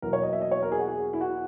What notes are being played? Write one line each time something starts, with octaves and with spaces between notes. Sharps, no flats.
E2 B2 F#3 A#3 A#4
C#5
D#5
E5
D#5
C#5
A#4
G#4
F#4
G#4
E4
F#4